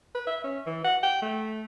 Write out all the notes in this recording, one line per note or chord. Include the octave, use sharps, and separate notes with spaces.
B4
E5
C#4
E3
F#5
G5
A3